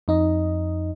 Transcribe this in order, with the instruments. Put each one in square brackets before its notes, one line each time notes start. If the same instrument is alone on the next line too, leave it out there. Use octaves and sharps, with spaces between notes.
[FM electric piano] F2 D#4 D#5